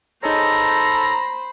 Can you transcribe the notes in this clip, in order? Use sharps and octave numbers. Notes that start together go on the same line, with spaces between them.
D#4 G#4 A4 C5 C#5 A#5 B5